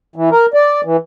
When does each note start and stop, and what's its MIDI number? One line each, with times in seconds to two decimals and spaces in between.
0.16 0.29 52
0.32 0.46 70
0.54 0.81 74
0.85 0.97 52